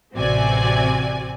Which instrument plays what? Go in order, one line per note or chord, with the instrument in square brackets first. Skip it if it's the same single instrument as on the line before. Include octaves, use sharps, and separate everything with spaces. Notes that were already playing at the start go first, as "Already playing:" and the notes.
[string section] A1 C3 C4 F#4 D5 G#5